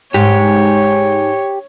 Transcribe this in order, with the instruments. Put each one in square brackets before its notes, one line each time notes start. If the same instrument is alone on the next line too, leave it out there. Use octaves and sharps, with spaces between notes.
[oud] G#2 [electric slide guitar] G4 [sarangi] C#5